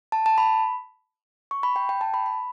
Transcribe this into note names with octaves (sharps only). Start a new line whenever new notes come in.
A5
A5
B5
C#6
B5
G5
G5
A5
B5
B5